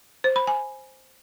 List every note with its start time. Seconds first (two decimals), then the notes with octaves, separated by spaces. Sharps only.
0.24 C5
0.36 B5
0.47 G#5